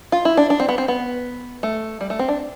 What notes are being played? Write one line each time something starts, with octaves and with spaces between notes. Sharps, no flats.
F4
E4
D4
D4
C4
B3
C4
B3
A3
G3
A3
C4
D4